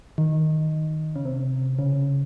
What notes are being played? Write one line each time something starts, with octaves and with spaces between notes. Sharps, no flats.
D#3
C#3
C3
C#3